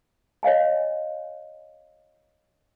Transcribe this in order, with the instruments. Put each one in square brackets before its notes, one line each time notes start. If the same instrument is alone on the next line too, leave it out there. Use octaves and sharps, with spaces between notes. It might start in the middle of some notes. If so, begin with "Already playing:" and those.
[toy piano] C#5 D#5 F5 G#5